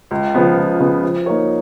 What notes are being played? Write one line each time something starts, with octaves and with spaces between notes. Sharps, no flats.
C#2
C#3 F3 B3
C#2
C#3 F3 B3
F3
A#3 D#4 A#4 C#5